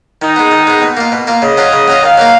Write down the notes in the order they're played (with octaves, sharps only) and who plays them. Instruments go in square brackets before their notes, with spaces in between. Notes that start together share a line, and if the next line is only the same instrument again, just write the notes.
[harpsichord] D#3 [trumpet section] D#4
[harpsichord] G#3 B3
D#3
G#3 B3
B2
A#3 F4
B2
A#3 F4
[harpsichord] C#3 [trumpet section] D#5
[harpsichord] F#3 C#4 F4
C#3
F#3 C#4 F4
[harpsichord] D#3 [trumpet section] F5
[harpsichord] F#3 A#3 D#4